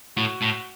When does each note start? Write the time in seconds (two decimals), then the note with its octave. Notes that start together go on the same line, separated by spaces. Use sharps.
0.17 A2 F#4
0.42 A2